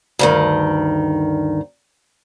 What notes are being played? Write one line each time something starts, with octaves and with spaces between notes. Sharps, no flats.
D2 G2 D#3